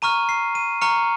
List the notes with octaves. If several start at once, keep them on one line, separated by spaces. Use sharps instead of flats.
A#5 C#6 F6 D#7
C7
D#7
A#5 C#6 F6 C#7